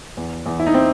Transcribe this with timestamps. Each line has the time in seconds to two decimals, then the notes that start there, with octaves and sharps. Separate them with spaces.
0.17 E2
0.46 E2
0.59 E4
0.67 D#4
0.74 C4